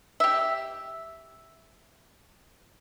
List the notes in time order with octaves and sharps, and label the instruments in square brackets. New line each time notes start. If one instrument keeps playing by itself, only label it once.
[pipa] G4 E5